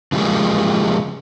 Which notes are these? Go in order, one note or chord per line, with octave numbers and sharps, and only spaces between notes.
C#3 F3 G3 G#3 A#3